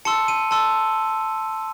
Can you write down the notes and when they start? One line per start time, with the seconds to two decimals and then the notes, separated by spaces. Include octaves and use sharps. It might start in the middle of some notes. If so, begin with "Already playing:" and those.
0.05 A5 C6 E6 C#7
0.28 D#7
0.51 A5 C6 E6